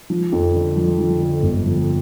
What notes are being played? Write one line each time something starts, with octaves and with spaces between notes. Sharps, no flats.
F3
F2
D3
F3
F3
D3
G1
F3